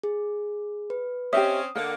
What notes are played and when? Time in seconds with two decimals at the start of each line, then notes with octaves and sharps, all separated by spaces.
0.03 G#4
0.90 B4
1.33 C4 C#4 G4 D#5 E5 D#6
1.76 D3 A#3 D#5 F#5